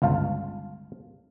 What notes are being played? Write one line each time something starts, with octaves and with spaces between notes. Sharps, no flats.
G1 C#2 F4 F5 A5